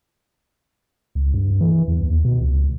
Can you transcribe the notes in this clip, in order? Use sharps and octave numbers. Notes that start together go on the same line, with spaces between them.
C#2
G2
E3
E2
D#2
B2
C#2